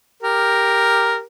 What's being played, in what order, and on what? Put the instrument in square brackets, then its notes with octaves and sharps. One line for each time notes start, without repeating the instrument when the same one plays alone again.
[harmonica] G4 A#4